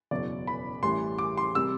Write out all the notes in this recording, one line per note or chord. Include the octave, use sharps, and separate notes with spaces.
F#1 E2 B2 F#3 D5
B5
A1 A2 E3 G3 C6
D6
C6
C3 G3 E6